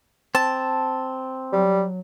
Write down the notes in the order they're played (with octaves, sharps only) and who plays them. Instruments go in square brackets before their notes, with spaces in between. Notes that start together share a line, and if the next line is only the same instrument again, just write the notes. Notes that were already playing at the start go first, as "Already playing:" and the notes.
[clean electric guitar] C4 [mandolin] A5
[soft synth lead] F#3 [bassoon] G3